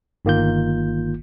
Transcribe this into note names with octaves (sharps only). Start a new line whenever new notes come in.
G1 D#3 A#3 F4 G6